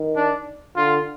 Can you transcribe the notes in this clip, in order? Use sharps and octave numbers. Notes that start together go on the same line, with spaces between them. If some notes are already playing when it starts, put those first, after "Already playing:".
Already playing: D#3
D4
D3 F4